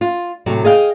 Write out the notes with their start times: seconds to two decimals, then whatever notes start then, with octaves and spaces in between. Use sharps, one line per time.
0.01 F4
0.46 A2 C3 F#3
0.64 G#4 D#5 F5 G5